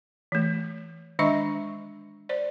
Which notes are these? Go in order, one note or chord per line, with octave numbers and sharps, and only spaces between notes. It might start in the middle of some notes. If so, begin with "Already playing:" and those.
E3 A3
D#3 G#3 D4 D#5 E5 C#6
C5 D5